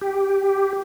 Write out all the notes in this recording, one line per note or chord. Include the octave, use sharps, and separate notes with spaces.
G4